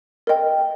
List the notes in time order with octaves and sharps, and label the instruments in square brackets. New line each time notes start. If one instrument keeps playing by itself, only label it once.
[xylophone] A#4 D#5 G5